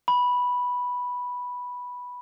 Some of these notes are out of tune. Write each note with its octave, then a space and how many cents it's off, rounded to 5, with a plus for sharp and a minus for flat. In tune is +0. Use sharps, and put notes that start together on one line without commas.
B5 -5